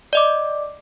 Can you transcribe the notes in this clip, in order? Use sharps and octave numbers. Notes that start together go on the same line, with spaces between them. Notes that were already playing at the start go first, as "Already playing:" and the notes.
D5 D#5 D6